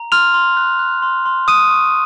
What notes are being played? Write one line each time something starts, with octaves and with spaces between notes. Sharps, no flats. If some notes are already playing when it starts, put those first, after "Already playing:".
Already playing: A#5
C6 F6 F7
C6
F#6
F#6
C6
C6
D#6 F#6 D#7
C#6